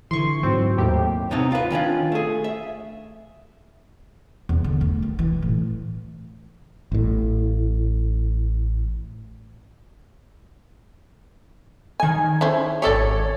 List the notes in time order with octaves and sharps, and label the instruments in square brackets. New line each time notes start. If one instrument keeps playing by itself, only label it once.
[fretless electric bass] D3 E3 [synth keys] C6 C#6
[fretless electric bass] G#2 F#3 [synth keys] C4
[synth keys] D#2 A2 G4
[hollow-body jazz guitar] C3 B3 C4 D#4 C#5 A5
F4 B4
D#3 C#4 D4 F4
A3 G#4
E5
[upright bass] E2
D3
A3
D#3
E3
A2
[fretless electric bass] A1 A2
[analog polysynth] D#3 G#6 [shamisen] G#5
[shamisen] C#4 E4 C5
[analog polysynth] G#1 C#5 [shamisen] G4 A4 D5